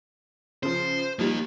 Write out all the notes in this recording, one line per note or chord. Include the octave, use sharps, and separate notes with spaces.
C#3 F3 C5
F3 G3 A#3 D#4